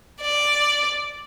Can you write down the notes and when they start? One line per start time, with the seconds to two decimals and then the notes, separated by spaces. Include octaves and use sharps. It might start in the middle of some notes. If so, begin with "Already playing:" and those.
0.21 D5